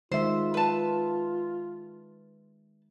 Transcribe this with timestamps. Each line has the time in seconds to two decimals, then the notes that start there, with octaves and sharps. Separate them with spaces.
0.12 D#3 G#3 F4 C5 E5
0.54 B4 A5